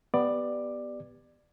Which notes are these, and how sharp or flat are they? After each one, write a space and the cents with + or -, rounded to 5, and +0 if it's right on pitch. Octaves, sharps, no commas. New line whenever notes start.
B3 +0 G4 +0 D5 +15